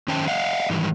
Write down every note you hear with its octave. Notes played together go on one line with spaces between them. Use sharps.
D#3 C#4 C5 G5 A5
D#5 F5 F#5
G#2 D#3 E3 G3